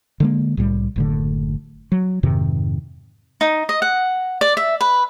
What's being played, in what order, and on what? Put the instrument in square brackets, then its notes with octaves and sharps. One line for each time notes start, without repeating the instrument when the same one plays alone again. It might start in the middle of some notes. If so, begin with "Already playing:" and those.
[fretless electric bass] D3 G#3 A#3
C2 A2 F#3 G3
F#1 A2 D3
F#3
F2 G#2 C3 D#3
[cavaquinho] D#4
D#5
F#5
D5
E5
B4